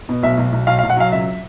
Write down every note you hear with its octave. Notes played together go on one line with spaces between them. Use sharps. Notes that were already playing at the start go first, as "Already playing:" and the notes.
B2
B1 E5
B1
B1
B1 F5
F5
B1
F#5
F#3 F5
C#2 E5